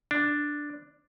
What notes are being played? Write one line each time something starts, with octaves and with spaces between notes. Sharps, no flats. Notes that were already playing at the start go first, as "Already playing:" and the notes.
D4